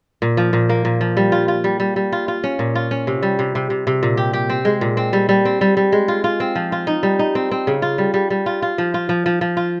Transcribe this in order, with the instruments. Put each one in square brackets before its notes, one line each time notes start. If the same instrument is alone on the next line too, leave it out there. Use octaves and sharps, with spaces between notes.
[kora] A#2
F3
A#2
A#3
A#2
F3
G3
F4
F4
G3
G3
G3
F4
F4
C#4
A#2
F4
C#4
C3
G3
C3
C3
C3
C3
A#2
G4
G4
C4
G#3
A#2
C4
G3
G3
C4
G3
G3
G#3
F4
F4
C4
F3
F4
D#4
G3
D#4
C4
C4
C#3
F4
G3
G3
G3
F4
F4
F3
F4
F3
F3
F3
F4